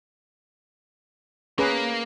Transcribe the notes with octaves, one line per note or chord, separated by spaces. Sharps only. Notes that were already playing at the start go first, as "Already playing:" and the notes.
A#3 C#4 G#4 B4